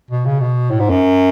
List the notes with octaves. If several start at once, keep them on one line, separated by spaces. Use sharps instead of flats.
B2
C#3
B2
A2
G#2
F#2